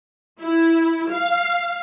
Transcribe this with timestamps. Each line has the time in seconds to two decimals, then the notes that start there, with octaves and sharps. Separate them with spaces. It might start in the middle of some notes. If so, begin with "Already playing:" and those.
0.40 E4
1.11 F5